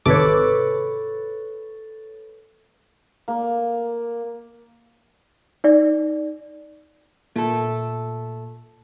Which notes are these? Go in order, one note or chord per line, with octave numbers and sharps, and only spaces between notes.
G#1 C3 A4 B4 C#5 D6
A#3
D#4 D5
A#2 A3 A4